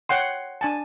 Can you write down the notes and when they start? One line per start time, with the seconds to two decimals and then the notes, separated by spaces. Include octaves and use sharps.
0.09 C#5 F#5 G5 C6
0.61 D4 G#5 A5